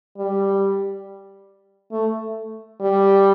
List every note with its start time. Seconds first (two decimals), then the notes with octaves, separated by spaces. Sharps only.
0.18 G3
1.92 A3
2.81 G3